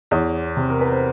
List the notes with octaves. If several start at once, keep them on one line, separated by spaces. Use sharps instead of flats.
E2 C#5
C3
A#4
B4
C5